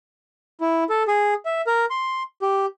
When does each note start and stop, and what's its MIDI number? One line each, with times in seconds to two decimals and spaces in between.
0.61 0.84 64
0.90 1.03 69
1.08 1.34 68
1.45 1.61 76
1.67 1.85 70
1.90 2.23 84
2.42 2.66 67